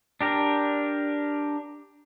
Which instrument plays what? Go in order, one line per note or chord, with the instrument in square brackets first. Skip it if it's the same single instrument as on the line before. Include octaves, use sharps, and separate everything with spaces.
[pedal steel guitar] D4 G4 A#4